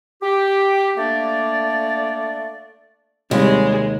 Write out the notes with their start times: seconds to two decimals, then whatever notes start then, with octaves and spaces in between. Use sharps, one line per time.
0.22 G4
0.97 A3 A#3 D4 D5
3.31 D#2 C3 G3 G#3